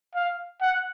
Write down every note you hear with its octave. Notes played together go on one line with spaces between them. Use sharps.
F5
F#5